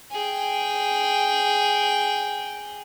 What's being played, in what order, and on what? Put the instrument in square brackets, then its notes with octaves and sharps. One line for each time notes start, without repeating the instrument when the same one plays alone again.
[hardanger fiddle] G#4 G5